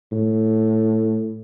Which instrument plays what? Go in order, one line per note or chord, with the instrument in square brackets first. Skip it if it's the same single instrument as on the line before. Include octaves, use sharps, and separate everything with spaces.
[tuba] A2